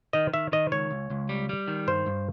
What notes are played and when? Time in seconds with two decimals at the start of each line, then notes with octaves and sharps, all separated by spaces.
0.13 D#3 D#5
0.33 D#3 E5
0.52 D#3 D#5
0.71 C#2 C#5
0.91 C#2
1.10 C#2
1.29 G3
1.49 G3
1.68 D#3
1.87 G2 C5
2.06 G2